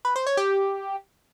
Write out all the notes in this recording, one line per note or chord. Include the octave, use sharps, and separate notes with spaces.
B4
C5
C#5
G4